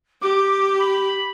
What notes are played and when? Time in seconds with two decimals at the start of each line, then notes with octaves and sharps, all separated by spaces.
0.21 G4 D6
0.79 B5